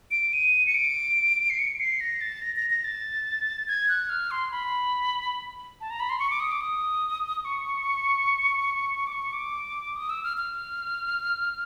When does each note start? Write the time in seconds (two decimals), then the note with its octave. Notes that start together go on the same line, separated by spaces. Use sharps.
0.11 D7
0.33 D#7
0.66 C#7
0.75 D7
1.50 C7
1.59 C#7
1.80 C7
2.01 A#6
2.21 A6
2.42 A#6
2.56 A#6
2.70 A#6
2.84 A6
3.68 G#6
3.89 F#6
4.09 F6
4.31 C6
4.52 B5
5.81 A5
5.90 A#5
6.00 B5
6.09 C6
6.19 C#6
6.30 D6
6.40 D#6
6.51 D6
6.61 D#6
7.45 C#6
9.07 D6
9.13 C#6
9.33 D6
9.96 D#6
10.10 E6
10.24 F6
10.37 F6